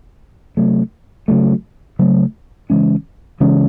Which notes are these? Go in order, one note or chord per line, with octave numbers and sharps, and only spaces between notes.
C3 F#3 A3
C#3 F#3 A3
C#3 F#3 A3
C#3 E3 G#3 C#4
C#3 E3 G#3 C#4